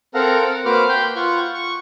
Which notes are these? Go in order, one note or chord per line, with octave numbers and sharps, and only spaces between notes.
C4 A4 A#4 F5 F#5 A#5
F#5
A#3 F#4 B4 C5 D6 F6
G5 B5 C6 G6
F4 F#5 C#6
C#6